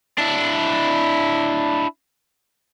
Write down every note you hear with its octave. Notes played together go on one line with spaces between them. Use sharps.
D4 E4